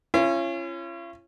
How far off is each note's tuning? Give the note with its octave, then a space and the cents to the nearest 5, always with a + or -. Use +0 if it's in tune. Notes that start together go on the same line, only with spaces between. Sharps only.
C#4 -15 F4 -45